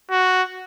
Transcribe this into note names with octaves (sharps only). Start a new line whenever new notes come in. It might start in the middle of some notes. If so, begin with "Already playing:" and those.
F#4